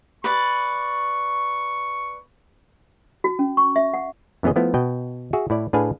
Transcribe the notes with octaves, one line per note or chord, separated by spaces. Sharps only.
B4 D5 C#6
F#4
C#4
C#6
E5
F#5
F#2 E3 B3 C#4 G#4 D#5
F3 A3 B3 E4
B2 D#5 F#5 G5
F#4 G#4 E5
A2 E4 D5
A2 D4 G#4 B4 F5 G#5